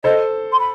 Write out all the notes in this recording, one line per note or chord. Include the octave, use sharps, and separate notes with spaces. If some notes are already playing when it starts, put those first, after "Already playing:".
A4 C5 D#5
C6
B5